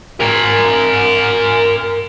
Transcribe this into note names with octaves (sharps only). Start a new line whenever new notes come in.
A#4 G#5